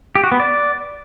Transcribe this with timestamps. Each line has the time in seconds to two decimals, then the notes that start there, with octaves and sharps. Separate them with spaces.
0.15 G4
0.24 F#4
0.32 B3
0.40 D5